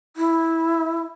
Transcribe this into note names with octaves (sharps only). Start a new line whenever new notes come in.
E4